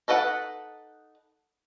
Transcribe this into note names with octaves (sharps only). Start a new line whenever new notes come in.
D#4 A4 B4 D5 F#5